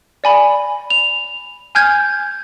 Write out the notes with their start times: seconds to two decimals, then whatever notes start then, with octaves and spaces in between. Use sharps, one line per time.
0.24 D5 G#5 B5
0.90 F7
1.75 G#5 F6 G6 G#6